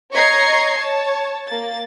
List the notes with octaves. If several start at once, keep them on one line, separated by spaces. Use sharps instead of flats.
C#5 D#5 A#5 C#6 G#6 C7
C#5 A5
A#3 A6